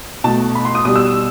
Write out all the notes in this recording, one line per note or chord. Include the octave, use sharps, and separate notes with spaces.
B2 A3 A5
B5
C6
D#6
B2 G3 D#6
E6